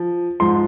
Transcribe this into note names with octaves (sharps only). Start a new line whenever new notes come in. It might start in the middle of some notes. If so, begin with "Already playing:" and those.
Already playing: F3
G#2 F3 C6